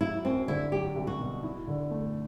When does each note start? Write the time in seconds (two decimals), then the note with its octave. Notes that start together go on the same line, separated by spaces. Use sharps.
0.01 F#3 E4
0.25 F#2 C4
0.48 D3 E4
0.72 F#3 G4
0.96 C2
1.07 F#4
1.19 B2
1.43 E4
1.67 D3
1.91 A3